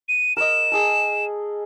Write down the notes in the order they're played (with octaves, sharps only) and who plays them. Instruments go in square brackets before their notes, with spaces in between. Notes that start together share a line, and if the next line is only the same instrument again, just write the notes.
[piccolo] D#7
[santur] A#4 D#5 [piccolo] E7
[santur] G#4 A4